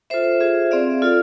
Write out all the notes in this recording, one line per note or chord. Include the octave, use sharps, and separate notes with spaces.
F4 A4 C5 E5
F4 G#4 C5 E5
C4 G#4 D5 F5
F4 A4 D5 F5